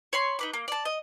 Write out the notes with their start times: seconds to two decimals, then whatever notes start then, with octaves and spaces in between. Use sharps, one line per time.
0.13 C#5 B5 C6
0.39 D#4 B4 D6
0.53 A#3
0.68 D5 A5
0.85 D#5